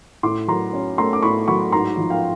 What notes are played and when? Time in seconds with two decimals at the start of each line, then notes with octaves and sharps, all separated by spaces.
0.23 A2 C6 D6
0.48 F#3 A#5 C6
0.73 C#4
0.98 A3 A#5 C6
1.13 D6
1.23 A2 B5 C#6
1.48 F#3 B5 C#6
1.72 G#2 A#5 C6
1.97 F3
2.10 F5 G5